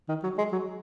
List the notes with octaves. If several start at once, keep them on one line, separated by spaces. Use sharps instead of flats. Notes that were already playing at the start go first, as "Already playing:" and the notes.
D#3
F#3
G#3
F#3